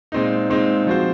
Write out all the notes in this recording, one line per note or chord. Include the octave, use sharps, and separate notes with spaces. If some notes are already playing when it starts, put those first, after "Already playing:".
A#2 G#3 C4 D#4
A#2 G#3 C4 D#4
F3 C4 F#4 C5